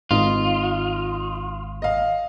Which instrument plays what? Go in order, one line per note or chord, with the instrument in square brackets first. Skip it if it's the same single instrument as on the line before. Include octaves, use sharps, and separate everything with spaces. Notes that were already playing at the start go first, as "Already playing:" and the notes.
[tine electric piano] G#1 [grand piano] D#4 [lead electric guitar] F4
[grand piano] D#5 F5